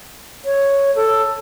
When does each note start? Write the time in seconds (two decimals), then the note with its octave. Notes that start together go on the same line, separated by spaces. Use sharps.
0.45 C#5
0.95 A4